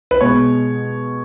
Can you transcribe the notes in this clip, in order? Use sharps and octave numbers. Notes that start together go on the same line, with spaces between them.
B4
B2 G#3 B3 C#5